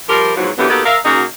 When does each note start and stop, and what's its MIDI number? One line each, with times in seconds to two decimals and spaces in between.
0.08 0.32 53
0.08 0.32 55
0.08 0.32 67
0.08 0.32 70
0.35 0.50 40
0.35 0.50 44
0.35 0.50 53
0.35 0.50 54
0.57 0.68 50
0.57 0.68 52
0.57 0.68 54
0.57 0.68 58
0.57 0.68 59
0.57 0.68 67
0.69 0.84 58
0.69 0.84 59
0.69 0.84 63
0.69 0.84 66
0.69 0.84 67
0.69 0.84 69
0.85 0.97 70
0.85 0.97 76
0.85 0.97 77
1.04 1.23 49
1.04 1.23 58
1.04 1.23 63
1.04 1.23 66